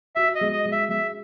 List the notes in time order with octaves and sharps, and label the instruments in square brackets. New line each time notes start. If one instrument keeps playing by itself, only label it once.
[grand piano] F#4 [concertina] E5
[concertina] D#5
[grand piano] G#3
[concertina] D#5
[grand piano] G#3
[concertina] E5
[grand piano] G#3 [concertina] E5